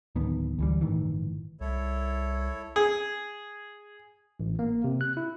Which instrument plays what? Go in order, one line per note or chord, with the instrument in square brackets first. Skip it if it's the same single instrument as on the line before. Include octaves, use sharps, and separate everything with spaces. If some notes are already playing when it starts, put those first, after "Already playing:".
[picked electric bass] D1 D#3 B3
D2 E3 G3
G1 A2 D#3 E3
[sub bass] C2 [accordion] E4 A4 C#5
[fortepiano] G#4
[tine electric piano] A1
A#3
C3
F#6
E4